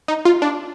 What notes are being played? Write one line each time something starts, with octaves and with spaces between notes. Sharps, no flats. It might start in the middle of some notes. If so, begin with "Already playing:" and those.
D#4
F4
D4